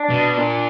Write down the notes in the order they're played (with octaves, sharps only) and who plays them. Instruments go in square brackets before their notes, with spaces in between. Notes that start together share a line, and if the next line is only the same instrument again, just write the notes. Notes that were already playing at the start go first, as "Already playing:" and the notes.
Already playing: [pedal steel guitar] D4
[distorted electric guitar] B2
A#2